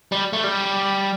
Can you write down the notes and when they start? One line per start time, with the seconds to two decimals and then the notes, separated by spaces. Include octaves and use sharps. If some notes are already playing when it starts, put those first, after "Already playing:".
0.12 G3
0.33 A3
0.44 G3